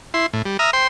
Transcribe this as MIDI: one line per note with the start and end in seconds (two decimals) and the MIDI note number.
0.14 0.26 64
0.14 0.26 84
0.33 0.42 45
0.46 0.57 55
0.59 0.71 76
0.59 0.71 82
0.59 0.71 87
0.59 0.71 89
0.73 0.87 72
0.73 0.87 79
0.73 0.87 84